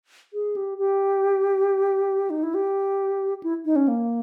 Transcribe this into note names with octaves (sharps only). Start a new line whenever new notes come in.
G#4
G4
G4
D#4
E4
G4
E4
D#4
C#4
A#3